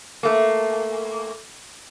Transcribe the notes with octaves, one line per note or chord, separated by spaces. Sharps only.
A3 A#3